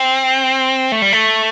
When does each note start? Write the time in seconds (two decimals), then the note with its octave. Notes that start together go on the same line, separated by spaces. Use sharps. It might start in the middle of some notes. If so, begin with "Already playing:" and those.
Already playing: C4
0.92 A3
1.02 G3
1.13 A3